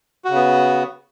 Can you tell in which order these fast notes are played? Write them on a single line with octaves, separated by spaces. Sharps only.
F#4 C#3 B3